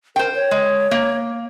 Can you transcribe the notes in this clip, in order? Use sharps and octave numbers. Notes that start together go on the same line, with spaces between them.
A#4 C5 G5
C#5
G#3
A#3